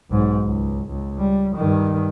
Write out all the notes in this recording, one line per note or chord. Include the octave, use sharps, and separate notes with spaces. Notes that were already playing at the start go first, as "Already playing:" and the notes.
B1 G#2
C#2
C#2
G3
G2 D#3